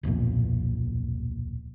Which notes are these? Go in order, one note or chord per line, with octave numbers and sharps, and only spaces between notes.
D1 B1 F2 A#2